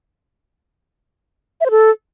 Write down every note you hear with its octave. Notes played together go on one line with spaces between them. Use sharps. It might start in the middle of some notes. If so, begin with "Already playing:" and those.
E5
C5
A4